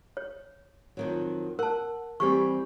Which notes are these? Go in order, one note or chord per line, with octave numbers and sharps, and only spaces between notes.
C#5
F2 D#3 F#3
A#4 F#5 A5
E3 G3 C4 G4 C#6